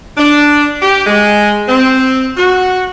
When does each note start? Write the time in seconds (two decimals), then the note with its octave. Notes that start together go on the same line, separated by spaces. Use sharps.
0.17 D4
0.82 G4
1.06 G#3
1.68 C4
2.37 F#4